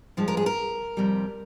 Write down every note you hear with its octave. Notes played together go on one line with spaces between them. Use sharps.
G2 F3 G#3
A#4
G#4
A#4
F2 C3 G3